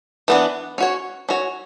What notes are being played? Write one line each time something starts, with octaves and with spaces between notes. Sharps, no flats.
E3 B3 D4
C#4 F#4 C#5
C#4 F#4 C#5